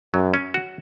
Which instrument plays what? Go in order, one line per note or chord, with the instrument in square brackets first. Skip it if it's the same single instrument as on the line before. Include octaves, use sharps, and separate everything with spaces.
[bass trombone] F#2 [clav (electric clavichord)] F#3
[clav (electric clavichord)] C#4
F#4